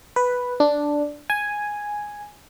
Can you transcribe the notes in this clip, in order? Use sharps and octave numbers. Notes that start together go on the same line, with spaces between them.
B4
D4
G#5